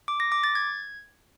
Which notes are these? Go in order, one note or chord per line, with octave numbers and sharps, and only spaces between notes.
D6
A#6
D6
A6
G#6